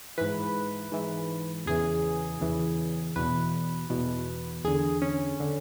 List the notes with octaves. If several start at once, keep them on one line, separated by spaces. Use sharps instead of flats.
G#2 E3 B4
G#2 E3
E2 C#3 E3 G#4
E2 C#3 E3
E2 B2 B4
E2 B2
E2 D3 G#4
C#4
D3